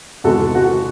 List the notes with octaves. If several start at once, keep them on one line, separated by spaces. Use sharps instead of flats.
E2 C3 D#3 G#3 F#4 A4
F#4